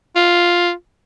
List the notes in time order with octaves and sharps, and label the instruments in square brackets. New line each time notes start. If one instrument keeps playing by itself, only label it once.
[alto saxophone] F4